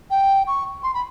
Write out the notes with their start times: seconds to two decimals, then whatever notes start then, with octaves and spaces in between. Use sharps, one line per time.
0.10 G5
0.47 C#6
0.83 C6
0.94 B5